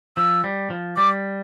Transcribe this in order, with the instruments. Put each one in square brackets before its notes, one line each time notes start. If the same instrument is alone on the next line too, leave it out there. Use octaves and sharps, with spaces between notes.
[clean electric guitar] F3 [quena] E6
[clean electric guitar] G3
F3
[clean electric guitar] G3 [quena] D6